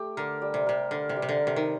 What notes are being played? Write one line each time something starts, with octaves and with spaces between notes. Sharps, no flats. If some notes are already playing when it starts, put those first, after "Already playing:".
Already playing: A3 G4
D3 A#4
G3
C3
C3 A#4
D3 A#4
C3
G3
C3
D3
A#4
C3
D#3